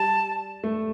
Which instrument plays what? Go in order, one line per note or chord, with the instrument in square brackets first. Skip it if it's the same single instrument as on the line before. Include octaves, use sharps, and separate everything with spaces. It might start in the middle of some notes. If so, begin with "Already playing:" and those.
Already playing: [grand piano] G3 [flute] A5
[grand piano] A3